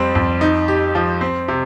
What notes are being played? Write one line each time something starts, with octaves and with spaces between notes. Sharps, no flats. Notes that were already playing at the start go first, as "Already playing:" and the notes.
Already playing: F2 G3 C4
F2
D#4
G4
F3
C4
C3